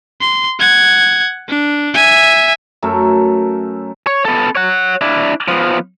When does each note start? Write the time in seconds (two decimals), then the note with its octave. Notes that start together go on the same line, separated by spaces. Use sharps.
0.21 C6
0.59 F#5 G#6
1.48 D4
1.95 E5 G#5
2.82 F#2 A3 A#4 E5
4.07 C#5
4.25 B3 A4
4.55 C#5 F#5
5.01 D4 E4
5.48 F3 B3